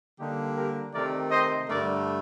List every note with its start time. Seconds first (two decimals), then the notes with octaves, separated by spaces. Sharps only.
0.19 D3 G3 A#3 D#4 G4
0.56 G4 A#4
0.94 C3 D#3 A3 A#4 D5
1.31 C5 D#5
1.69 G2 D3 A3 A#4 D5